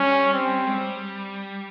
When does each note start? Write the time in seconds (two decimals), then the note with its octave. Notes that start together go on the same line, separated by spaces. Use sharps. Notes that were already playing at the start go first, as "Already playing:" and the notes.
Already playing: G3 C#4
0.33 C4
0.66 G#3
0.74 G3